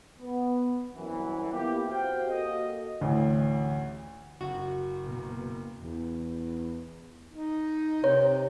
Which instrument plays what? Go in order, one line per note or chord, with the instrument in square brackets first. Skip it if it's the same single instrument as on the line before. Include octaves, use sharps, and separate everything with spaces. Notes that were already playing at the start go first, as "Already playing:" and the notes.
[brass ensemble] B3
C2 F#2 E3
A#3 B3 E4 F4 G4
C4 F#4 G4 C5 F5 G5
A#3 F#4 A4 D#5
[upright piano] A1 D2
[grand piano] F#1 [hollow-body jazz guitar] F#4
[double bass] B2 A#3
[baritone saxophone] E2
D#4
[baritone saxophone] C3 [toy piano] C#5